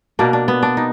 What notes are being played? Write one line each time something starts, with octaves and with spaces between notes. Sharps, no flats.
B2 A#3 D4
D4
B3
D4
D#4